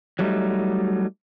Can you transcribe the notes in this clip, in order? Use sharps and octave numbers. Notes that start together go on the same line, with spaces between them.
F#3 G3 A3 D#4